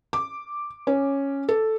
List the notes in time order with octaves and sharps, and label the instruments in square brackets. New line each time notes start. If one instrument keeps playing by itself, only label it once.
[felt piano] D6
C#4
A4